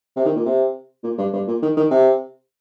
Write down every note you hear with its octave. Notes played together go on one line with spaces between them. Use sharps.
C3
D#3
A#2
C3
A#2
G2
G2
A#2
D#3
D#3
C3